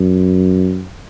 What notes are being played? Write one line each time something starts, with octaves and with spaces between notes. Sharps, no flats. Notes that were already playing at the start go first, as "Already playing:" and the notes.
Already playing: F#2